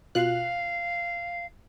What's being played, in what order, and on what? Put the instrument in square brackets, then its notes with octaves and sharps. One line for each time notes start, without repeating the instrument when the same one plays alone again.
[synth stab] B2 F4 F#6 [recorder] F5